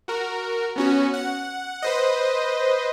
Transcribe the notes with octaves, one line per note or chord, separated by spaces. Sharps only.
F#4 A#4
B3 C#4 F#4
F#5
B4 C5 D#5